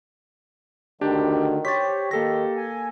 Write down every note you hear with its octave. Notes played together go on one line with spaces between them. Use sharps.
D2 D3 D#3 D4 G4
G4 C5 C#5 A6 B6
D#3 A#3 G4 A4 A#6
G#5